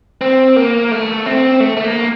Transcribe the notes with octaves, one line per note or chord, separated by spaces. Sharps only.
C4
A#3
A3
C4
A3
A3
A#3